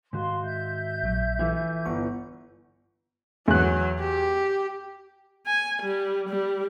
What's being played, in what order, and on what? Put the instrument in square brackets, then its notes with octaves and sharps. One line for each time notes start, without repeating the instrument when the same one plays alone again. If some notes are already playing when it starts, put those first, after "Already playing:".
[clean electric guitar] G#2 D#3 F#4 [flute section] F5 C6
[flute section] E5 G6
[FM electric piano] A#1 A#2 F#3
[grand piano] E3 [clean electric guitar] E4 F4 A4
[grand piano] G1 [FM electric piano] C#6
[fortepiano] E2 F#6 [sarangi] F#3
[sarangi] G4
[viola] G#5
G3
G3